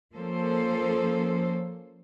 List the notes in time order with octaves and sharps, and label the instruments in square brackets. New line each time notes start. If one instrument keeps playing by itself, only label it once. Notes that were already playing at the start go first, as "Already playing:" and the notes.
[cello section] F3 A#3 C#4 A4 C5